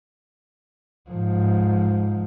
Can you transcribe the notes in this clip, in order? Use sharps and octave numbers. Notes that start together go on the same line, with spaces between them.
G#2 F3